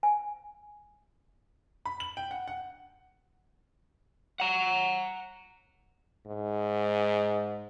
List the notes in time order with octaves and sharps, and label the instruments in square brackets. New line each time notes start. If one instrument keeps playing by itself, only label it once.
[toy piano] G#5
[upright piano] B5
F#7
G5
F#5
F#5
[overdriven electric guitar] F#5 A#5
[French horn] G#2